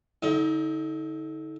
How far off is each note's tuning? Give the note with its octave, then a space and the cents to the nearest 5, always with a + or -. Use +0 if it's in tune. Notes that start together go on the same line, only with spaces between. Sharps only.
D3 -20 D#4 +35